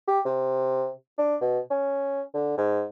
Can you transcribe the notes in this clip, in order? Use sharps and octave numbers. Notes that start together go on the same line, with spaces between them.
G4
C3
D4
B2
C#4
D3
G#2